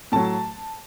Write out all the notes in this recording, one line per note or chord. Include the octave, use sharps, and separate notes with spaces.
A2 F#3 A5